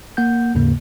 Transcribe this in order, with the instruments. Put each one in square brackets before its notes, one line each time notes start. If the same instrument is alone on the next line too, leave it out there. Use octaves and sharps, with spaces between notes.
[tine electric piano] A#3 F#5 G6
D#2 G#2 C#3 A#3